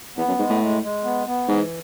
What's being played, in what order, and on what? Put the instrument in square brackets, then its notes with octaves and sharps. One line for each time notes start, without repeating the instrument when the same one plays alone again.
[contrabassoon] E2 [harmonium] B3
[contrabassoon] F#2
[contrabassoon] G#2 [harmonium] G#3
[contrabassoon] A2
[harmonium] G#3
G#3
B3
B3
[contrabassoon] G#2 [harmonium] E3